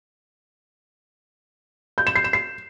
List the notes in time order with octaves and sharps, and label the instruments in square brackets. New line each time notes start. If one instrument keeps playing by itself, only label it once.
[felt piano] G6
E7
C7
E7
C7